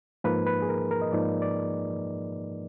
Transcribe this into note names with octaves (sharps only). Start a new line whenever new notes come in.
G#2 F3 A#3 D#4 B4
B4
G#4
A#4
A#4
D#5
G#2 F3 A#3 D#4 D5
D5